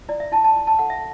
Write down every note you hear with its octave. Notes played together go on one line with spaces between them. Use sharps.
E4 D5
E5
E4 A5
A5
E4
A5
A4 F#5
E5